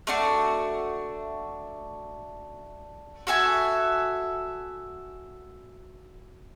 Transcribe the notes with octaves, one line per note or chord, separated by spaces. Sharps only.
A3 D4 F#4
F#4 A4 E5 G#5